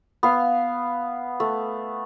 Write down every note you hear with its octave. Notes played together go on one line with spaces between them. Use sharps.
B3 F5
A3